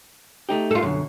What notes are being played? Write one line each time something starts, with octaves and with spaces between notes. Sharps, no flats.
A3 D#4 G4
F4 A4
B1 F#2 D3